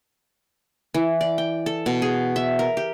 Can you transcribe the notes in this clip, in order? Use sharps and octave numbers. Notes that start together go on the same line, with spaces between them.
E3
D5
G5
A4
B2
G#4
E5
A#4
G4